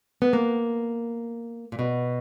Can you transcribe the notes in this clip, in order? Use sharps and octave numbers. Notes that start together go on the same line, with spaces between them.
B3
A#3
A#2
B2